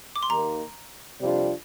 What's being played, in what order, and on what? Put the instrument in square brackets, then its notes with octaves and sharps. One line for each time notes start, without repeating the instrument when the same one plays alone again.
[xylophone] D6
C6
[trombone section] D#2 D#3 A#3 [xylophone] A#5
[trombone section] F2 C3 G3 D4 F4